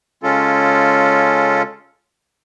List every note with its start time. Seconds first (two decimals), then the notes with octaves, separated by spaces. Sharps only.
0.23 C#3 G#3 C#4 F4 A4